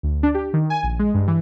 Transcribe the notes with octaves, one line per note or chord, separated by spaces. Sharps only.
D2
D4
G4
D#3
G#5
A#1
G#3
G2
E3